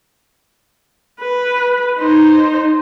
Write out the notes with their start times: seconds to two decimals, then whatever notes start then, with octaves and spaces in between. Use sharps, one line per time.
1.21 B4
2.00 D#4 C5